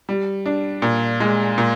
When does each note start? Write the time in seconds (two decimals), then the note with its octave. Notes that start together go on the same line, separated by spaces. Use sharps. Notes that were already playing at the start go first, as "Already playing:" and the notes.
0.09 G3
0.46 D4
0.82 A#2
1.20 G#3
1.58 A#2